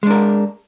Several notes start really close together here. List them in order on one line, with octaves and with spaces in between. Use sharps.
G#3 D4 A#4